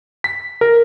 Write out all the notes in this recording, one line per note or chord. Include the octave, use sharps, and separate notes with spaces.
B6
A#4